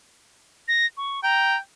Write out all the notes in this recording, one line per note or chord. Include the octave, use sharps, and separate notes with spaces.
A#6
C#6
G5 A#5